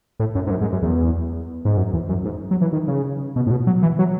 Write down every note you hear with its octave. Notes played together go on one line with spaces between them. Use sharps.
A2
F#2
G#2
F#2
G#2
F#2
E2
G#2
F#2
E2
F#2
G#2
F#3
E3
D#3
C#3
B2
A2
B2
F#3
E3
F#3